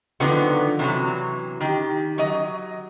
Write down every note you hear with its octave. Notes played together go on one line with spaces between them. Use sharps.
D3 D#3 F3 F#3 B3
C3 E3 F#3
D#3 G4
F#3 D#5